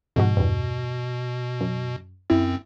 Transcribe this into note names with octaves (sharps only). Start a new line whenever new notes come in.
F2 G#2 B2 F#4
E2 G2
F#2
F#2 C4 E4